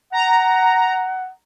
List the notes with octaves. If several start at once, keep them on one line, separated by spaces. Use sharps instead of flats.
F#5 A#5